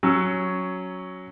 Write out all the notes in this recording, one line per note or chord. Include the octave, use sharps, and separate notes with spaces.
F#3 C#4 E6